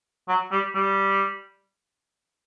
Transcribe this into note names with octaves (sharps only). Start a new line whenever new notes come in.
F#3
G3
G3